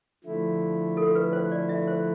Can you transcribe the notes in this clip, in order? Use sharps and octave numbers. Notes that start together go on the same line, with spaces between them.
D3 F3 A3 E4
A4
B4
C5
D5
E5
C5